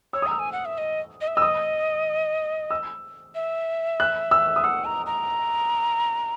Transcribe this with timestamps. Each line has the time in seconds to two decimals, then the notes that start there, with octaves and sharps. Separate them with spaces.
0.13 C#5 E6
0.22 D#6
0.27 A#5 E6
0.39 G#5
0.52 F#5
0.65 E5
0.78 D#5
1.21 D#5
1.27 E5
1.36 D#5 E6
1.42 D#6
2.71 E6
3.35 E5
4.00 F#6
4.31 E6
4.56 D#6
4.64 F#5 E6
4.85 A#5
5.06 A#5